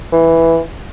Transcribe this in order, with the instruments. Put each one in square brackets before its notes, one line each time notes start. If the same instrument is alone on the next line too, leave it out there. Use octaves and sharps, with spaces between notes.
[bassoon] E3